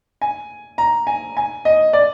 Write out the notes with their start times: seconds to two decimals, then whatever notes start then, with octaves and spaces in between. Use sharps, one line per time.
0.21 G#5
0.78 A#5
1.07 G#5
1.37 G#5
1.65 D#5
1.93 D5